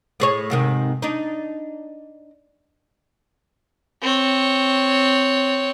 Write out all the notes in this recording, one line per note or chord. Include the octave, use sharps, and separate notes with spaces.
A2 G#4 C#5
G#2 C3 D#3
D4 D#4
C4 C#5